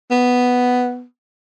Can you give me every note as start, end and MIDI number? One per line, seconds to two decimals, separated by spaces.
0.11 1.04 59